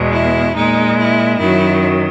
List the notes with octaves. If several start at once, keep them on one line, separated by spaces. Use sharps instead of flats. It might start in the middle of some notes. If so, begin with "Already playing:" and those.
Already playing: E2 B2 G#3
E4
A#2 G#3 D#4
E4
F#2 D#3 F#3 E4